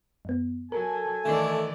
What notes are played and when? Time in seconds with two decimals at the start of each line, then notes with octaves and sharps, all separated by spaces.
0.25 F#2 B3
0.72 F#3 A4 A#4 G#5
1.25 D#3 E3 A3 D5